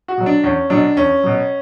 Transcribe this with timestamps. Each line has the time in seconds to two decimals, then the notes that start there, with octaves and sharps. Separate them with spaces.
0.08 F#4
0.18 B2 F#3
0.26 D4
0.44 E2 C#4
0.70 B2 F#3 D4
0.97 E2 C#4
1.24 B2 F#3